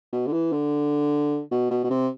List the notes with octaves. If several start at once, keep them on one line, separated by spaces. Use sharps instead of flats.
B2
D3
E3
D3
B2
B2
B2
C3